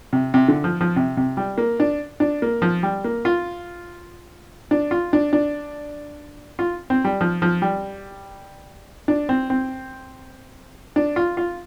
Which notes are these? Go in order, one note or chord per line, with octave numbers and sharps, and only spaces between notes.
C3
C3
D3
F3
F3
C3
C3
G3
A#3
D4
D4
A#3
F3
G3
A#3
F4
D4
F4
D4
D4
F4
C4
G3
F3
F3
G3
D4
C4
C4
D4
F4
F4